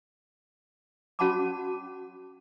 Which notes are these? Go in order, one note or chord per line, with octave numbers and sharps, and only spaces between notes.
C#4 F#4 F#5 A5 B5 D6